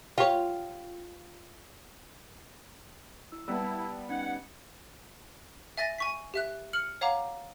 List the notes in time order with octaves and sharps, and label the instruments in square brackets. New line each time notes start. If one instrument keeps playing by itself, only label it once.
[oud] F4 [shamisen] G4 C#5
[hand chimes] E4 E6
[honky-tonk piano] G3 B3 [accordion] E4 [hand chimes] A5 E6
[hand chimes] C#4 D#4 G#6 [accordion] F#5
[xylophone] E5 G#5 A6 A#6
G#5 C#6 B6
G4 E5 F#6
F6 C#7 F#7
C#5 F5 F#5 A#5 D6